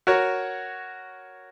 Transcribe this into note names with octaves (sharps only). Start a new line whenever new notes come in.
F#4 A#4 C#5